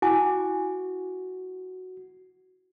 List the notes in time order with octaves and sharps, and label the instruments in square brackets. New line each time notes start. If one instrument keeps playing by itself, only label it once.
[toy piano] E4 G#5 D6 [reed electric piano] F#4